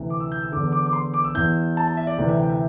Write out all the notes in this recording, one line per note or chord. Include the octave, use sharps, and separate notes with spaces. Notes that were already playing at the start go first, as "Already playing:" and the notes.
Already playing: D2 C3 E3
D6
E6
G6
E6
E2 D3 D6
D6
D6
C6
D6
E6
E2 E3 G6
A5
A5
E5
D5
D2 C3 E3 D5
E5
G5
E5